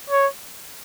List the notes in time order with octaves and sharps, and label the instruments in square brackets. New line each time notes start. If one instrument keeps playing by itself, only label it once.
[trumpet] C#5